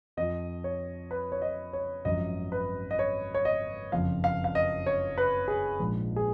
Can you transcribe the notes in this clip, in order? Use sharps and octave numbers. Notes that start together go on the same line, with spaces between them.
F2 F3 D#5
C#5
B4
C#5
D#5
C#5
G#1 F#2 F3 D#5
B4
D#5
C#5
C#5
D#5
F#1 F2 F3 F5
F5
F5
D#5
C#5
B4
G#4
A#1 G#2 F3
G#4